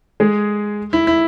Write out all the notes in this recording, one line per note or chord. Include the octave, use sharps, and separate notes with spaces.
G#3 G#4
E4
E4